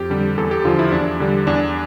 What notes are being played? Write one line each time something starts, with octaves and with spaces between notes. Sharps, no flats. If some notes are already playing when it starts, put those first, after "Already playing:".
Already playing: F2 G4
D3 G3
E2 A4
G4
D3 F3 F4
E4
E2 D4
D3 G3
E2 D4